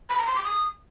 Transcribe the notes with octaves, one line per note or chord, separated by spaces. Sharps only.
B5
A#5
C6
D6
D#6